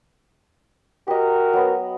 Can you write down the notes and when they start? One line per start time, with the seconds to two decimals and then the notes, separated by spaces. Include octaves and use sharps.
1.08 F#4 G4 A#4 D#5
1.53 F#3 B3